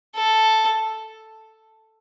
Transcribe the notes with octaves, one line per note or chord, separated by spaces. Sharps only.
A4